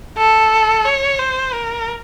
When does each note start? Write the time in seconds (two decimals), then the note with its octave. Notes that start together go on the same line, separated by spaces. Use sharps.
0.17 A4
0.85 C#5
1.19 C5
1.53 A#4